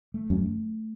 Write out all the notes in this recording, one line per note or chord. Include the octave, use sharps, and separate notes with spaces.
A3
F#2
A3